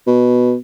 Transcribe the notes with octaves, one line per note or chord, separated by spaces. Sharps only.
B2